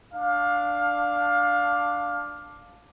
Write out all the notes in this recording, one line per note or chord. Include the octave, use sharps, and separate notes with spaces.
D4 F5